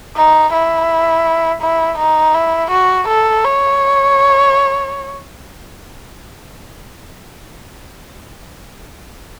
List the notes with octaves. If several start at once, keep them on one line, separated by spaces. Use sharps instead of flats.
D#4
E4
E4
D#4
E4
F#4
A4
C#5